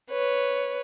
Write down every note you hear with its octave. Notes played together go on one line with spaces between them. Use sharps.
B4 C#5